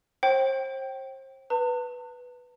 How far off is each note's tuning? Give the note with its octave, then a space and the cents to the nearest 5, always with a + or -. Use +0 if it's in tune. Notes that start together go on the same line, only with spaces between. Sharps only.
C5 +35 G5 -20
B4 +0 A5 +45